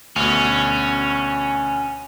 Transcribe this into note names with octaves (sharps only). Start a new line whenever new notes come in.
D2 B2 C#4